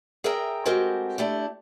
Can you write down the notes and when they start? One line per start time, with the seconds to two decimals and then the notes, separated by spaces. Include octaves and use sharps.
0.24 G#4 A#4 E5 G5 A#5
0.65 G#3 A3 C4 F#4 G4 A#4
1.18 A3 D4 E4 G4